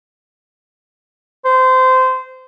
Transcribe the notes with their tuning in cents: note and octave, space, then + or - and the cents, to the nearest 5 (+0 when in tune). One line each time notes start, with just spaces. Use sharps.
C5 -20